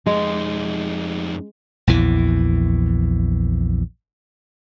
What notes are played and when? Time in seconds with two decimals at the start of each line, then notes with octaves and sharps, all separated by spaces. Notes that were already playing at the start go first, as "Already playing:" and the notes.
0.06 F2 G#3 D#4
1.87 A#1 E2 E3